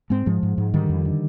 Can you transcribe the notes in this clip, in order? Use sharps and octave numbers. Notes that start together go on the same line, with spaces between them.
G#2 G#3 C4
G#2 F3 G#3
G#2
G#2
D3 D#3 G3
F2
D3